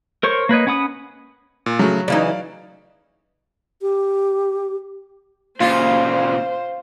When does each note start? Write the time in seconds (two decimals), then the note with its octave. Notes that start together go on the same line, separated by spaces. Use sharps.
0.23 A#4 C5 C#5 C#6
0.49 A#3 B4 C#5 D#5
0.67 C#4 F#5 B5 D#6
1.66 A#2
1.79 C#3 F#3 A3
2.08 C#3 E3 D#4 D5 F5
3.82 G4
5.60 A#2 C#3 F4 C5